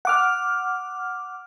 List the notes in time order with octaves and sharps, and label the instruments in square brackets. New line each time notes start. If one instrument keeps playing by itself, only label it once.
[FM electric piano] F#5 D6 F6